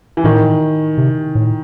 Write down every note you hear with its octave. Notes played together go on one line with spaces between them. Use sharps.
E3
A2 D#3
C3
A2